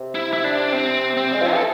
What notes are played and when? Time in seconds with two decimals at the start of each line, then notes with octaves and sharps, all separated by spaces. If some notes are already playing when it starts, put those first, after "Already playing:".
Already playing: C3
0.15 E4
0.33 E4
0.44 D4
0.73 C4
1.17 C4
1.34 G#3
1.42 F3
1.52 E3 A4